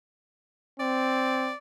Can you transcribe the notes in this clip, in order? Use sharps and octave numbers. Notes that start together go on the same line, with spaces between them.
C4 D5